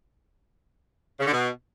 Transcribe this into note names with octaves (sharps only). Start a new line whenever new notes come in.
C#3
D3
B2